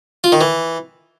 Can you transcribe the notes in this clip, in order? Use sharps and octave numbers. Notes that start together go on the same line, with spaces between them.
F4
D#3
E3